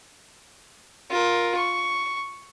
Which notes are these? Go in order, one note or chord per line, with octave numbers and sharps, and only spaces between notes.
F4 A#4
C#6